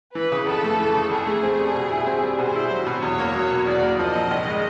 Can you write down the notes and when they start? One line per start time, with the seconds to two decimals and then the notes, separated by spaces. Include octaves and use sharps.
0.15 E3 B4
0.32 C#3
0.47 F2 A4
0.64 A3
0.80 E3
0.95 C#3
1.11 F2 G#4
1.27 A3
1.43 C4
1.59 G3
1.75 B2
1.91 E4
2.07 C4
2.23 G3
2.38 B2 C5
2.56 E4
2.71 F#3
2.86 B2
3.02 E2 C#5
3.19 A#3
3.35 F#3
3.51 B2
3.67 E2 D5
3.83 A#3
3.99 F3 D#5
4.15 A#2
4.31 C2
4.47 G#3